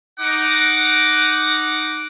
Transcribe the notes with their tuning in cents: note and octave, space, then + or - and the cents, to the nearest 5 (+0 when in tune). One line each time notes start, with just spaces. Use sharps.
D#4 +0 F#5 +0 D6 -5